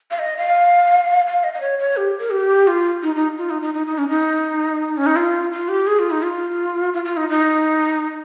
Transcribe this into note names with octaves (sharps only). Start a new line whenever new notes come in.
F5
D#5
F5
F5
D#5
D#5
C#5
C#5
G4
A#4
G4
F4
D#4
D#4
F4
D#4
D#4
D#4
D#4
C#4
D#4
C#4
D#4
F4
F4
G4
G#4
F4
D#4
F4
F4
F4
D#4
D#4